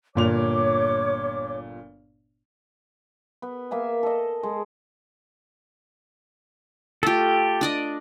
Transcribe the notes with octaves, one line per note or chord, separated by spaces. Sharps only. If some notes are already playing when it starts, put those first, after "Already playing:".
G1 A#2 C#5 D6 F7
B3
A#3 E5 G#5
A4 D#5
G#3
A3 F4 G4 A4
D4 D5 D#5